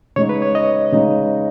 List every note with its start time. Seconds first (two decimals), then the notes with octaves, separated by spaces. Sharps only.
0.16 C#3 G#3 D#4 C#5
0.29 B4
0.42 C#5
0.55 D#5
0.92 C#3 G#3 D#4